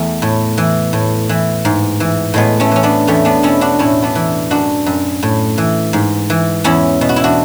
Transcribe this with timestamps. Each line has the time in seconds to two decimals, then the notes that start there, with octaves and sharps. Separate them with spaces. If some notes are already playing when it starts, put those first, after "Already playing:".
Already playing: E2 A3
0.22 A2
0.58 E3
0.93 A2
1.29 E3
1.65 G#2
2.00 E3
2.34 A2 G#3 B3
2.60 A3 C#4
2.71 E3 C#4
2.83 B3 D4
3.07 E2 A3 C#4
3.25 B3 D4
3.43 B2 C#4 E4
3.61 D4 F#4
3.79 A2 C#4 E4
4.02 B3 D4
4.15 E3
4.51 F#2 D4 F#4
4.86 F#2
5.23 A2
5.58 E3
5.93 G#2
6.30 E3
6.64 E2 C#4 E4
7.01 B2
7.09 F#4
7.16 E4
7.24 D4 F#4